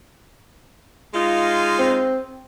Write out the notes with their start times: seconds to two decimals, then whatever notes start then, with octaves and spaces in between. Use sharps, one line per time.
1.14 G#3 D#4 F4
1.79 C4